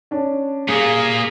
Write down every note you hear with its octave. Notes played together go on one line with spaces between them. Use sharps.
C#4 D4
G2 A#2 A#3 G#4